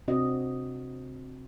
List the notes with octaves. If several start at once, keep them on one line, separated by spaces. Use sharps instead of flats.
C3 C4 D4 F#4 D#5